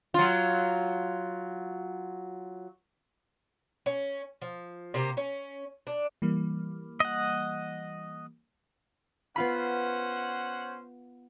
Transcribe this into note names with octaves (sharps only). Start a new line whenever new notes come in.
F#3 F4
C#4
F3
C3 A#3 G4
C#4
D4
E3 G3 A#3
D#5 F#5
B3 C#4 F4 C5 F#5 B5